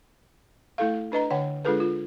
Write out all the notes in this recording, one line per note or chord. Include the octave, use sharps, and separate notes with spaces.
A3 E4 A4 F5
D4 B4 D#5 A#5
D3 C#5 F#5 G5
G#3 D4 F4 G#4 A4 B4
F4